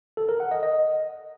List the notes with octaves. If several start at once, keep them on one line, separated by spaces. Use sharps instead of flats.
A4
A#4
F#5
D#5
D#5